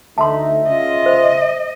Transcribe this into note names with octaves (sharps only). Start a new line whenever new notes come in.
D2 A3 D#4 E5 A5 C6
C#3 F4 D#5
C5